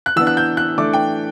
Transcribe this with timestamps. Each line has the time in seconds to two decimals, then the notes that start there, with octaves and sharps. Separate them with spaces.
0.06 F#6
0.16 E3 B3 D4 E6
0.27 F#6
0.37 G6
0.57 F#6
0.78 E3 A3 D4 D6
0.93 G5